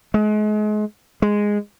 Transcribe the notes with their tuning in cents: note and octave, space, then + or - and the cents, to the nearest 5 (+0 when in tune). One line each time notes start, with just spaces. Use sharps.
G#3 +35
G#3 -5